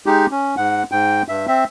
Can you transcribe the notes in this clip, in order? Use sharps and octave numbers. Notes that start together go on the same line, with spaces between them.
G#3 D#4 G4
C#4
G#2 F#5
G#2 G5
G2 E5
C4 E5